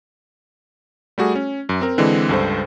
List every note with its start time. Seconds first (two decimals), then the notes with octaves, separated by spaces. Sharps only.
1.18 G3 A3 F#4 G#4
1.35 C#4
1.69 F#2
1.81 C4 A#4
1.98 D3 E3 G#3 C4
2.29 C#2 G2 A4 C5